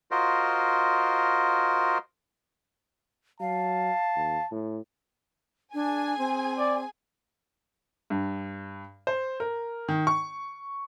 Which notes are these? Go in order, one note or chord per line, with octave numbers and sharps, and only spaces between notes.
F4 F#4 A#4 C5 D#5
F#3 F5 A5
D#2
A2
D4 G#4 G#5
C4
D5
G2
C5
A#4
D#3
C#6